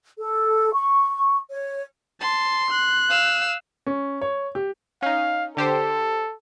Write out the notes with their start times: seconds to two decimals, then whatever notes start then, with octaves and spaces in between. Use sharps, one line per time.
0.18 A4
0.72 C#6
1.51 C#5
2.21 A5 C6
2.70 F#6
3.10 F5 E6
3.86 C#4
4.21 C#5
4.55 G4
5.02 C#4 D#4 F5
5.57 D3 G4 A4 C5